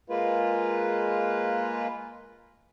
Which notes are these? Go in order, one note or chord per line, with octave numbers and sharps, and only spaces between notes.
G#3 A#3 F4 B4